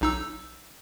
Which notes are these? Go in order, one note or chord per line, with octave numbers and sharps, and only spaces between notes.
B1 D#4 E6